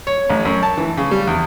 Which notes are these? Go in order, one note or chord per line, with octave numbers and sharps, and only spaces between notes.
C#5
A1
F#2
A5
E3
C#3
G3
E2